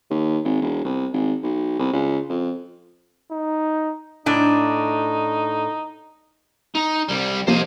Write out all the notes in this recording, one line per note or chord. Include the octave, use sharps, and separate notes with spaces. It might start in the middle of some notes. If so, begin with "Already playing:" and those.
D#2
G#1
E1
C2
G#1
B1
C2
C#2
F2
D#4
A2 D4 D#4
D#4
C2 G3
C3 F3 A#3 C5 D#5